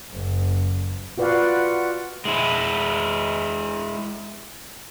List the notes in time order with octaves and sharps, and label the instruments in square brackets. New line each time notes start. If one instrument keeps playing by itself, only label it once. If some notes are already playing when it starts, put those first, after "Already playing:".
[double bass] F#1
[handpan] F4 F#4 B4 D5 F5 F#5
[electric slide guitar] G#3 E4